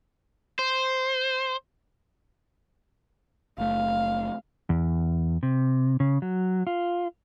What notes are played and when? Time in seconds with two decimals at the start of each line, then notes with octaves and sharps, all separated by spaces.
0.59 C5
3.58 F#1 A3 F5
4.69 E2
5.43 C3
6.00 C#3
6.22 F#3
6.67 F4